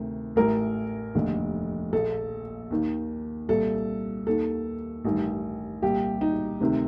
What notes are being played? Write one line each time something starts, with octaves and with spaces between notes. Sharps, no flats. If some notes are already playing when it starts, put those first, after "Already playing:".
Already playing: D2 C3 D#3
A1 A2 A#4
F1 D#2 D3
A#1 A#2 A4
D#2 D#3
C2 A#2 A4
D#2 D#3 A4
A1 G2 D#3
C2 A#2 G4
D#4
D2 C3 D#3